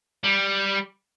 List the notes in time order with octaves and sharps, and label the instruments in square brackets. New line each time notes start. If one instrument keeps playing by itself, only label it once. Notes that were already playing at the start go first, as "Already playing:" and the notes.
[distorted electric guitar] G3